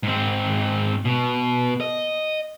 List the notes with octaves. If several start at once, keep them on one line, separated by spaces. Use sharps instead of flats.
G#2 C4
B2
D#5